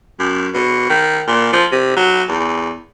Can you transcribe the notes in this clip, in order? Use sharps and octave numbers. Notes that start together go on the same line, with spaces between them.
F#2
B2
D#3
A#2
F3
C3
F#3
E2